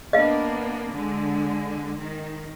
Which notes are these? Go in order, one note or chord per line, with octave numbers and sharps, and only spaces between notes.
A#3 B3 D4 D#5 F5
D3 G#3
D#3